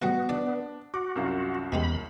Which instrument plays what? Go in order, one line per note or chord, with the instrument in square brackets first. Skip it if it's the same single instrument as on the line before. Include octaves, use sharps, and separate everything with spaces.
[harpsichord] A2 F#3 G3 [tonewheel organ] B3 [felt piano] F#4
[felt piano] D4 [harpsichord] D5 D#6
[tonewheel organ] F#4 [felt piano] D6
[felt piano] C2 F#2 F4
[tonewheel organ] E2 B5 [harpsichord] B2 G#3 G4